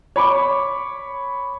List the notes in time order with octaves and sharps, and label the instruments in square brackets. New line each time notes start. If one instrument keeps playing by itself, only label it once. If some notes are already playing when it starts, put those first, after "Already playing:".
[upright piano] C#5 B5 D6